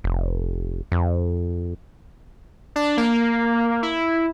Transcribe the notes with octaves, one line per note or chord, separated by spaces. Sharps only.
F1
F2
D4
A#3
E4